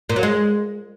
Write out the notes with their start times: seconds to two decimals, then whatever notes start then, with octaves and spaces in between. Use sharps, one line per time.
0.09 A#2
0.16 F#3
0.23 G#3